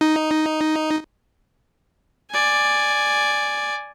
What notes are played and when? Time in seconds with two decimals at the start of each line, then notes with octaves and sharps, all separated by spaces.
0.01 D#4
2.31 D5 G#5